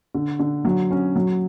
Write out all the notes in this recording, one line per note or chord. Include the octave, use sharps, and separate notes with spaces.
D3
D3
F#3
C#4
F#3